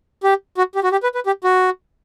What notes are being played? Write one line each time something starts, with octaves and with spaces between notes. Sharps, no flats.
G4
F#4
G4
F#4
G4
B4
B4
G4
F#4